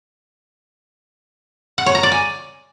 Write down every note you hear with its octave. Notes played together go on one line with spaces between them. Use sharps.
F#5
C#5
A#5
D5
G#5